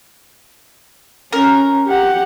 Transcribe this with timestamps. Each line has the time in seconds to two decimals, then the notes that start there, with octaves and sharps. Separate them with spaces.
1.33 C#4 A#4
1.87 G4 F#5